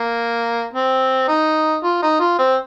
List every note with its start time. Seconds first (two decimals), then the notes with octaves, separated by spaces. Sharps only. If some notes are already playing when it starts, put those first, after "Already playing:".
Already playing: A#3
0.73 C4
1.28 D#4
1.83 F4
2.02 D#4
2.20 F4
2.39 C4